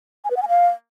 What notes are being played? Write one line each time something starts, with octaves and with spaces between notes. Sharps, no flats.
G#5
B4
F#5
G#5
F5